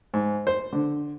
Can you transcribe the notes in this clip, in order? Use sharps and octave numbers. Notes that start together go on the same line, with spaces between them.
G#2
C5
D3